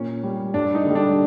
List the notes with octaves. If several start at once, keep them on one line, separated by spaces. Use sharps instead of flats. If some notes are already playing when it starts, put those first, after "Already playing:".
Already playing: A#2 C#4
G3
G2 D4
D#4
D3 G3
D4